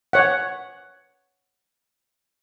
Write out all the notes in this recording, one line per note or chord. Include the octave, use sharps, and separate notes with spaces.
C#5 F#5